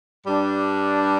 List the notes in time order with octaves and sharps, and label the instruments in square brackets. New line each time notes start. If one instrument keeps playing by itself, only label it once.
[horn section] G2 G3 D4